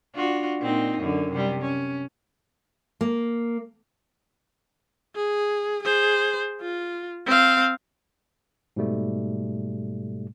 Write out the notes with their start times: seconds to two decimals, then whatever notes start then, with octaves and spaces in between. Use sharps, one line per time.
0.15 D4 F4 F#4
0.61 A#2 C4 D#4
1.00 F#2 D3
1.32 C3 G3
1.62 C#4
3.01 A#3
5.15 G#4
5.82 G#4 C5
6.61 F4
7.27 C4 F5
8.76 G#2 B2 G3 A3